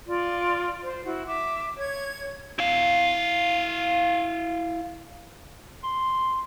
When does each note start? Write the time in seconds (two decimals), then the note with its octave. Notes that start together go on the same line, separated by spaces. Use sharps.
0.07 F4 D5
0.81 C5
1.05 E4 F#4
1.27 E5 D6
1.77 C#5 G#6
2.59 E4 F5
5.83 C6